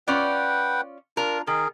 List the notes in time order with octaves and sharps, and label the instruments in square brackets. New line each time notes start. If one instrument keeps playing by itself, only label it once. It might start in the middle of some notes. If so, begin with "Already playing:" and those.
[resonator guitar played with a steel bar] C#4 F4 D5 [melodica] B4 F#5 G5
[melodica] D4 F4 [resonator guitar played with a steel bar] A#4
[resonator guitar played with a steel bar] D#3 [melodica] G#4 A#4